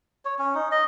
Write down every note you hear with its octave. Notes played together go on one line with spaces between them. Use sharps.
C#5
C#4
D#4
D#5